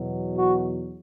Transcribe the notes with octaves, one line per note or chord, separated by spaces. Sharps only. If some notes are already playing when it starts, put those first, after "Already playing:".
Already playing: E2 B2 F#3
F#4